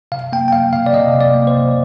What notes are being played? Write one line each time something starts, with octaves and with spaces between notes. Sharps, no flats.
C3 F5
A#3 G5
G5
A#3 F5
C3 F5
D5
C3 D#5
C3
D5
A#3
C5
C3